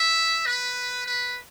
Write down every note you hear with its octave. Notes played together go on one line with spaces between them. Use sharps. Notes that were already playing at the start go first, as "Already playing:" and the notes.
Already playing: E5
B4
B4